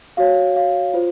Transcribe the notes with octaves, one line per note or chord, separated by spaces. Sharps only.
F#4 C#5 F5
F5
F4 C5